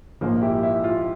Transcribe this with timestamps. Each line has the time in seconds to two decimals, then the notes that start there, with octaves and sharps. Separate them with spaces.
0.21 A#1 G#2 F3 A#3
0.42 E4 G4
0.63 E4
0.84 F4